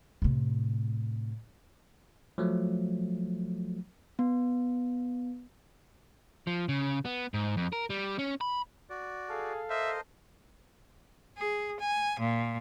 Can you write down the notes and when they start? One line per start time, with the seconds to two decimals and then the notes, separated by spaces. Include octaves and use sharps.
0.22 A2 C3
2.38 F3 F#3 A3
4.19 B3
6.47 F3
6.69 C#3
7.05 B3
7.34 G#2
7.57 F2
7.73 A#4
7.90 G3
8.19 C#4
8.41 B5
8.90 F#4 D5
9.29 G#4 A4 F5
9.70 A#4 C5 D#5 E5
11.37 G#4
11.79 G#5
12.19 A#2